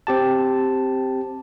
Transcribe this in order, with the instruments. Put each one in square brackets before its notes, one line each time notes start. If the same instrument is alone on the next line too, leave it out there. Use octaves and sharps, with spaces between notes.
[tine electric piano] C4 G4 A5